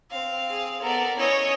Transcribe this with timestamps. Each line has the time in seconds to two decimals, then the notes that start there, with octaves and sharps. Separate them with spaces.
0.11 C4 F5
0.50 G#4
0.82 B3 A4 A#4 D5
1.17 C#4 E4 C#5 D#5